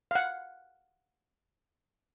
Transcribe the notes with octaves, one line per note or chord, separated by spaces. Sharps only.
F5 F#5